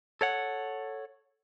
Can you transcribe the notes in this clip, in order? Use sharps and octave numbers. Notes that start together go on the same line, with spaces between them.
A4 C#5 F#5